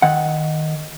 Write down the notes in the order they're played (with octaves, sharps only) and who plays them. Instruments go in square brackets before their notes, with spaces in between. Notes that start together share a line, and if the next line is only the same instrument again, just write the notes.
[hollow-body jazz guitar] D#3 F#5